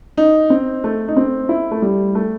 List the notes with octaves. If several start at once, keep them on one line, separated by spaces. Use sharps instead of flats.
D#4
C4
A3
D#4
C4
E4
A3
G3
A3